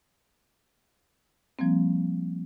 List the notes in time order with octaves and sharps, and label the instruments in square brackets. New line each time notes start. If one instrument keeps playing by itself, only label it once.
[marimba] F3 G3 A#3 C4